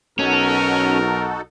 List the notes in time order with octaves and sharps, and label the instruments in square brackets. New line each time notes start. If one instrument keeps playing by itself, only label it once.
[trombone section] B1 [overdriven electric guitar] C#4 [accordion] D#4 F#4 A4 [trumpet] A#4